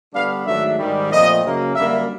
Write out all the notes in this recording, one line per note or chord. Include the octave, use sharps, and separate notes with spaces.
D3 G3 B3 D4 F5
G#2 D#3 F#3 A3 D4 E5
G#2 D#3 G3
A#2 F3 A3 C4 D#5
F#2 C#3 F#3 A#3 C#4
F#2 D3 G3 A#3 E5